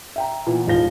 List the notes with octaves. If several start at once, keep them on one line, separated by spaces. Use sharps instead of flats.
E5 G5 A#5
A#2 E3 B3
D#1 G#1 F3 F5 A#6 G7